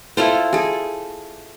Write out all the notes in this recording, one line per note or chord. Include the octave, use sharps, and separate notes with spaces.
E4 F4 A4 C5
G#4 A4